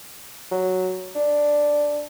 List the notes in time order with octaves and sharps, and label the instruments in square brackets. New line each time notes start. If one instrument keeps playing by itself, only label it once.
[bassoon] F#3
D4